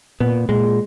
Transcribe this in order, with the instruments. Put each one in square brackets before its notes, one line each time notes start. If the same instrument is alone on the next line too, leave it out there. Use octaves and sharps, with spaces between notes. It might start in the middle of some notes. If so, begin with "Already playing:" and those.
[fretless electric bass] A#2 [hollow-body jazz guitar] B3
[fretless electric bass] A#2 [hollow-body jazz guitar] G#3